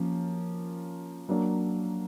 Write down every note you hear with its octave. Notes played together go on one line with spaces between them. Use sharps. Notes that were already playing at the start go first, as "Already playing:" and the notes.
Already playing: F3 A#3 C#4
F#3 A#3 D4